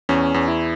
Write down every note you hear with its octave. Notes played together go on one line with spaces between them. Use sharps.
E2 C#4
E2
E4